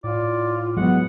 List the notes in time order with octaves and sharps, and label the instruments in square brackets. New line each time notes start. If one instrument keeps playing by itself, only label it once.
[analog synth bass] A2 [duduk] F4 [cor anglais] D5
[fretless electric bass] F#3 G#3 [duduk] B3 [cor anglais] F#5